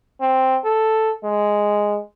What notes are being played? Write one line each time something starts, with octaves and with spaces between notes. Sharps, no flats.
C4
A4
G#3